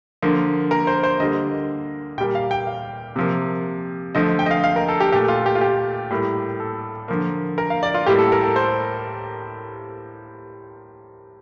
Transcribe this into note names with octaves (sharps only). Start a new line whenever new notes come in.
D3 F3 A#3
A#4
C5
C5
D3 G3 A#3 D#5
A#2 G3 A#3 G5
F5
G5
F5
C3 F3 A#3
D3 F3 A3 D#5
G5
D#5
F5
F5
A#4
A4
G4
A#2 A3 G4
F4
G4
F4
G4
A2 G3 A#3
A4
D3 F3 A#3
A#4
F5
D5
F4
A2 G3 A#3 G4
A4
A#4
A4
C5